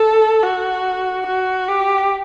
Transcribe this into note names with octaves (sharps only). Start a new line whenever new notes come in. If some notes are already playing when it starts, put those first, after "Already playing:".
Already playing: A4
F#4
F#4
G4